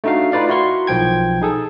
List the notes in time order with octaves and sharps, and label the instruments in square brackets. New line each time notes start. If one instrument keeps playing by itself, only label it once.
[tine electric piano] A3 D4 D#4 F#4 F5
D#4 F4 B4 D5 F5
E4 F#4 A#4 C6 C#6
B1 F3 G5 G#6
D#4 G#4 A4